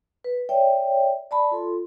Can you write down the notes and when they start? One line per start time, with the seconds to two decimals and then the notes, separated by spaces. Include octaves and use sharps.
0.24 B4
0.49 C#5 D5 E5 G5
1.31 D5 A5 B5
1.51 F4 A4 C6